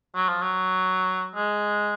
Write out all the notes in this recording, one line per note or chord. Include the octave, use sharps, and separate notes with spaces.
F#3
F3
F#3
G#3